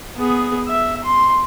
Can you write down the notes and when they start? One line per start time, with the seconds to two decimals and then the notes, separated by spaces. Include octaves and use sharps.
0.17 B3 G#4
0.67 E5
1.04 C6